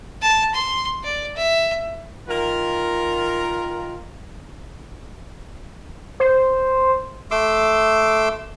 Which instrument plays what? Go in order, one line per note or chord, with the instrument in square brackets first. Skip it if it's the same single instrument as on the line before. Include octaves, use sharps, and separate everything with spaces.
[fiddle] A5
C6
D5
E5
[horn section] D#3 F4 A#4
[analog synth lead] C5
[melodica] A3 C6 D6 E6